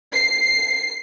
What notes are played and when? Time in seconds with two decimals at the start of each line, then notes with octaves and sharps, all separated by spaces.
0.13 C7